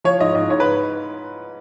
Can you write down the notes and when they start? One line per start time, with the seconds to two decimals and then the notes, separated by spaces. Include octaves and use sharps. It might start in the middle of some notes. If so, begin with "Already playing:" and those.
0.04 F3 C#5
0.20 G#2 D#5
0.35 G#2 D#5
0.49 G#2 C#5
0.60 B4